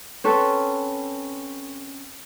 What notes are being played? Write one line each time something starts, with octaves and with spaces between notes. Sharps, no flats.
C4 C#4 A4 B4